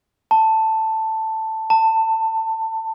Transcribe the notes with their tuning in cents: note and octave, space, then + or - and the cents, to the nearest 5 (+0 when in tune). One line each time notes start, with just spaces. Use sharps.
A5 +10
A5 +25